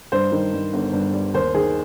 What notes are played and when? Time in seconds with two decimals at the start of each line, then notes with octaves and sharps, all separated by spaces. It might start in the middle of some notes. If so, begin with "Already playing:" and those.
0.12 G2 C5
0.32 D#3
0.53 G2
0.73 G1
0.93 G2
1.13 G3
1.34 D#2 C5
1.54 D#3 G#4